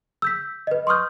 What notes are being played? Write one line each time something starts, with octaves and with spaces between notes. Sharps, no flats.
E6 G6 B6
B4 D#5
C6 C#6 D#6 F6 G6